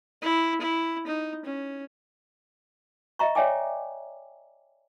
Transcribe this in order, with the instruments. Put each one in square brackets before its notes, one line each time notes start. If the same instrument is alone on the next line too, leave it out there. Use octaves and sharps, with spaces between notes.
[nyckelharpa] E4
E4
D#4
C#4
[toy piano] D#5 E5 A#5 C#6
C#5 D5 E5 G5 G#5 D6